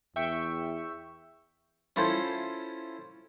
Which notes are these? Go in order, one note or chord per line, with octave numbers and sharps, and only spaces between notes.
E2 E5 G5 C#6
C#4 E4 F4 A4 C5